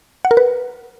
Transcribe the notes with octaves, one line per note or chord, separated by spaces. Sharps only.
F#5
A#4
B4